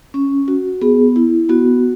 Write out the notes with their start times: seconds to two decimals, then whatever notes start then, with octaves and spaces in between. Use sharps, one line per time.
0.14 C#4
0.48 F#4
0.81 B3 G#4
1.16 E4
1.49 B3 F#4